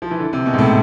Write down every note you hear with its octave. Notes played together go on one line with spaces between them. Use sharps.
F3
E3
D3
C3
B2
G#2
A2